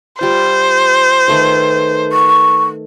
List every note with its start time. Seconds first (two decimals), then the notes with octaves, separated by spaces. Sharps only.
0.21 G3 F4 C5
1.28 D#3 A3 B4
2.12 C#6